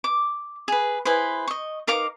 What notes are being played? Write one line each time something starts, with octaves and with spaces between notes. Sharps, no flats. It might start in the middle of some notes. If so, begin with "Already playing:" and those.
D6
G#4 B4
E4 G#4 B4 C5
D#5 C#6
D#4 A#4 F5 D6